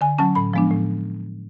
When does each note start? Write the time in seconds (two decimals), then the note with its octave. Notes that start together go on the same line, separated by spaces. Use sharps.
0.01 D3 G#5
0.18 F#3 C#4 A5
0.35 A2 B5
0.53 F3 G#3 B3 D4
0.70 A2